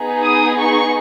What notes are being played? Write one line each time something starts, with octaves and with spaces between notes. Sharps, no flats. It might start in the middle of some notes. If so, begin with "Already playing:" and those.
Already playing: B3 D#4 G#4
D#6
C#6